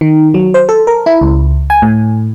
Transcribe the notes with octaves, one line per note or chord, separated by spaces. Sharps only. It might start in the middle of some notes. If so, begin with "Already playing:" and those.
D#3
F#3
C5
A4
A#4
E4
C#2
G#5
A2